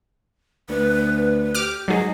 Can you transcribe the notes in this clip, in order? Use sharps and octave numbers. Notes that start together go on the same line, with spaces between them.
D2 B4
G4 D6 F6
G#2 F#3 G#4 D#5